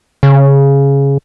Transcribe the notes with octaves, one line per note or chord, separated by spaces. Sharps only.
C#3